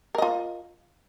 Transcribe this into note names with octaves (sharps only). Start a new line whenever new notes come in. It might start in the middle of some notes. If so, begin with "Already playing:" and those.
F4 A#4 D#5